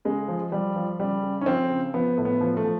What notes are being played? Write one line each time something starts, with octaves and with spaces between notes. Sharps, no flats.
C#3 G#3
F3
F3 G3
F3
C#3 G3
C#3
C#4
F3 C4
C#3
F3 B3
A2
B3
F3
A3
F3